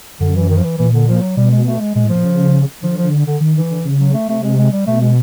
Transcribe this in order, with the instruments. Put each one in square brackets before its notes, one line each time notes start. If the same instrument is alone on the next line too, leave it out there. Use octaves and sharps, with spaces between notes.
[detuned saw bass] F#2 [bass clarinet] D3
[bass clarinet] E3
D#3
F3
E3
[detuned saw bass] A#2 [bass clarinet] E3
[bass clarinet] D3
F3
F#3
[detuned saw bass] B2 [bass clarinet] G3
[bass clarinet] G#3
A3
G#3
[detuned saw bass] A#2 [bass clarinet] G#3
[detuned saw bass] A2
[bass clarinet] F3
[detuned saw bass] A#2
C#3
[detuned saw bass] D3 [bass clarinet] F3
[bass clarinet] F3
D3
[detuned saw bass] D#3
[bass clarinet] E3
[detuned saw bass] D3
C#3
[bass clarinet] F#3
A3
[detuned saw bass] C3 [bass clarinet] A3
[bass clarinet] G#3
G#3
G3
[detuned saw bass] B2 [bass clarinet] A3
[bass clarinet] G#3